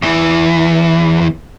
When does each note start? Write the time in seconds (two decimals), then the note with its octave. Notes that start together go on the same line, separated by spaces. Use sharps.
0.02 E2 E3